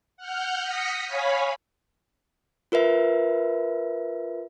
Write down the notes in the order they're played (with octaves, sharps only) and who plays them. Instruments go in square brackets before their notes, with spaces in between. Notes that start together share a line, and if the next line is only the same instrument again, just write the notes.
[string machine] F#5 F6 G6
D#6 A#6 B6 C#7
C#5 F5 G#5 B5
[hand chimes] F4 A#4 B4 E5